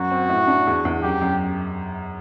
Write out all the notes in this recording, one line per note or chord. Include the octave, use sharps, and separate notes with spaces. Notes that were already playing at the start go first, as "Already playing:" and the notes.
Already playing: F#2 F#4
C4
A2
D4
E2
E2
F#2 G4
F#2